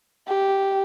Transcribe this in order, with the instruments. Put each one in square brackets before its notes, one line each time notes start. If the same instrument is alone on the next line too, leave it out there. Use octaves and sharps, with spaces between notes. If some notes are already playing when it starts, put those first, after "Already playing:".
[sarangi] G4